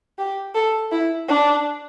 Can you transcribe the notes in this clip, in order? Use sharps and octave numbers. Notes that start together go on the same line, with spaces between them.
G4
A4
E4
D4